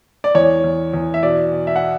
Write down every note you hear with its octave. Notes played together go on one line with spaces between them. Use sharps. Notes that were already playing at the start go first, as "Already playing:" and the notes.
D5
E2 C#5
E2
E2
E5
B2 D5
B2
E5
F#5